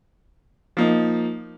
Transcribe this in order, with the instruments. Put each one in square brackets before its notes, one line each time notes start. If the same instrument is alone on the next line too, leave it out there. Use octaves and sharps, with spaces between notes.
[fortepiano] F3 A#3 D#4